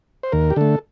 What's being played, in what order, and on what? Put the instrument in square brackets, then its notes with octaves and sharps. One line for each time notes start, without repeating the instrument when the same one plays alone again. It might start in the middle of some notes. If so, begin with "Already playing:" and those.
[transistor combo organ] C5
D#2 A#4
G4
D3 A3 A4